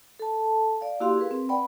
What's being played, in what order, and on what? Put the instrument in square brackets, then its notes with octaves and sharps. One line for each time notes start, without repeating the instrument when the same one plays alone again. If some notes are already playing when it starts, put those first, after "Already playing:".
[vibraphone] A4 A5
D5 F5
A#3 E4 F#4 G4 F5 C6
G#4 A#4 B4
C4 B4
B4 D5 F#5 G5 B5